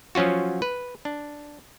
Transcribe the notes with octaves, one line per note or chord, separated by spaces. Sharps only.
F3 F#3 C#4 F4 F#4
B4
D4